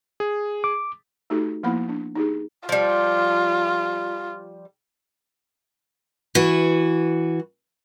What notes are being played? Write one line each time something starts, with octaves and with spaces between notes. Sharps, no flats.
G#4
D6
A3 D#4 F#4 G4 A4
F3 A#3 B3 E4 F#5 B5
D4
D#4 G4 G#4
F3 G3 F4
E3 F#4